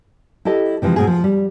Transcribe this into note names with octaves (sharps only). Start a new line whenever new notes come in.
E4 G4 A4 D#5
C3 E3 F3 G#3
G#2 B2 G#4
F3
G3